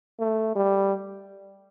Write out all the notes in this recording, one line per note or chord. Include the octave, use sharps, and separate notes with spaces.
A3
G3